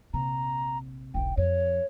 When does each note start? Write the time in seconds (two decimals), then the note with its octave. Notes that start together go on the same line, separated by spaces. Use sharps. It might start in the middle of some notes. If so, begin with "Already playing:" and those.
0.14 A#1 C3 A#5
1.14 E1 B1 G5
1.37 F2 C#5